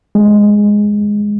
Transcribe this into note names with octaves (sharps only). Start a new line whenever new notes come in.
G#3